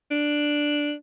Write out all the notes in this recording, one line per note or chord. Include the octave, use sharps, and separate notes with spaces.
D4